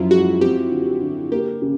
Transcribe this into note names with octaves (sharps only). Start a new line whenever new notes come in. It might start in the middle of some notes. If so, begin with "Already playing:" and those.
Already playing: F#2 F3 E4 F4
G#3 F#4
C4 G4
D3
D3
A#3 G4
C#3